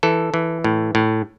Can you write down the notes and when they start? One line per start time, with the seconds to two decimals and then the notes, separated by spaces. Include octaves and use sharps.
0.03 E3 A4
0.34 E3
0.64 A2
0.95 A2